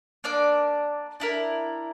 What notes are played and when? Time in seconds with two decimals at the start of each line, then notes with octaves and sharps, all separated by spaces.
0.24 A#3 D4 D5 D6
1.20 D4 E4 A#4